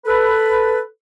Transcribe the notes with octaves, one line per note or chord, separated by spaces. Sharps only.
A4 B4